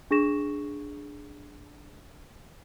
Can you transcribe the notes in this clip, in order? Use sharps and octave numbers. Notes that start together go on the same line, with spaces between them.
D4 G#4 C#6 A#6 E7